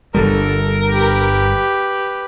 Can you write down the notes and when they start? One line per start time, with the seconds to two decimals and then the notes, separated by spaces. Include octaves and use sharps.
0.14 G1 D3 G3 A4 A#4
0.89 G4 B4